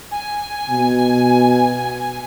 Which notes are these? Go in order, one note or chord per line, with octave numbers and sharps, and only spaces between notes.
G#5
B2